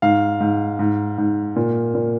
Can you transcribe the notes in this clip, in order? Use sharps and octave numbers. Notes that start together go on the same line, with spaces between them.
G#2 F5
G#2
G#2
G#2
A#2
A#2